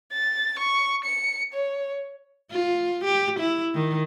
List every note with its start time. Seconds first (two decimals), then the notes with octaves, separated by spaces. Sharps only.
0.13 A6
0.59 C#6
1.04 C#7
1.53 C#5
2.51 F4
3.05 G4
3.40 E4
3.75 D#3